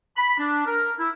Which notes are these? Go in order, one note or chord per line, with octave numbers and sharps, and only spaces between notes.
B5
D4
A#4
E4